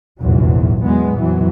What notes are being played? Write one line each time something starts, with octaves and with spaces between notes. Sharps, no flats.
F1 A#1 E2 G#2 F#3
E2 A#2 F#3 G#3 B3
F2 E3 F#3